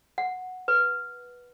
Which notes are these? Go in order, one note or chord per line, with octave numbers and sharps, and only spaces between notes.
F#5
B4